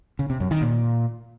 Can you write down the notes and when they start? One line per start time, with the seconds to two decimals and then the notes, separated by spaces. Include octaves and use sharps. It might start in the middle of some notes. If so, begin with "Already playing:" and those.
0.19 C#3
0.30 C3
0.40 F#2
0.51 D#3
0.62 A#2